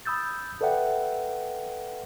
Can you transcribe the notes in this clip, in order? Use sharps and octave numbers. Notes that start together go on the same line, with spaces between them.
B5 D#6 E6 G6 A6
A4 B4 D5 E5 F#5 G5